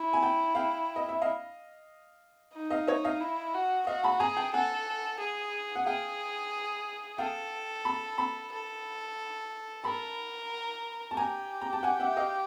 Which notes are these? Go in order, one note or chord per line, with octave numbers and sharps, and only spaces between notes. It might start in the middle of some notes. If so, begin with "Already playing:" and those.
Already playing: E4
G#5
G5 A5
F5 G5
D#5
E5
D#5 F5
D#4
D#5 F5
C#5 D#5
D#5 F5
E4
F#4
F#4 D#5 F5
A5 B5
G#4 G#5 A#5
G5 A5
A4 F#5 G#5
G#4
F#5
G#4 F5 G5
A4 F5 G5
A5 B5
A5 B5
A4
A#4 A5 B5
A5
G4 G#5 A#5
A#5
A5
F#5 G#5
E5 F#5
D#5 F5